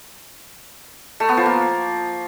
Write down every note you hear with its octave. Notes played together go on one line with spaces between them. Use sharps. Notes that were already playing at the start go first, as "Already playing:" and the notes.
A3
B3
F3
A#3